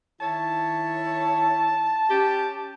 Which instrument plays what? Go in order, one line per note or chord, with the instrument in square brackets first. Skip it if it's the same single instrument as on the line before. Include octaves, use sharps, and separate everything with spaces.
[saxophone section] D#3 E4 C#5 [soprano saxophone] A5
[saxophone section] C#4 G4